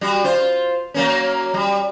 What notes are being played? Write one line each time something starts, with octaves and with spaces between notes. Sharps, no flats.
G3 F#4
F4 C5
F#3 A#3 C#4
G3